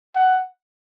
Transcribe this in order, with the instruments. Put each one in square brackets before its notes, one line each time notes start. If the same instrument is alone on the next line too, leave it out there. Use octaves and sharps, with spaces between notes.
[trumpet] F#5